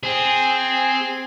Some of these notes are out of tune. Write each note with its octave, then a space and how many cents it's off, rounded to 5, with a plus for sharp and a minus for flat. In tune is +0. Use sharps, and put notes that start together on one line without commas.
C4 +0 G#4 -5